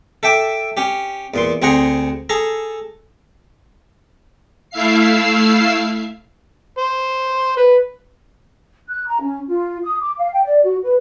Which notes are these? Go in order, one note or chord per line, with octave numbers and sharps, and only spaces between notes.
A4 E5 G5 D6
C#4 G4
E2 A#2 C6
D2 C4 G#4 C5 F#5 A#5
G#4 A4 A#5
A3 E4 E5 F5 C7
C5
B4
F#6
A#5
C#4
F4
D#6
D6
F5
G5
D5
F#4
B4